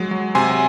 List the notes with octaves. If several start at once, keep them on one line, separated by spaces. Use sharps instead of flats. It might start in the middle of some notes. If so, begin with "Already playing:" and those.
Already playing: F#3 G#3
F#3
C3 G#5 C6